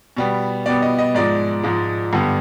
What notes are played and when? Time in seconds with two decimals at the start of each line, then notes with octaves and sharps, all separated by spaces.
0.17 B2 G3 B3
0.66 B2 G3 B3 D5
0.82 D#5
0.99 D#5
1.15 G#2 F3 G#3 D5
1.63 G#2 F3 G#3
2.13 G2 D3 G3 B3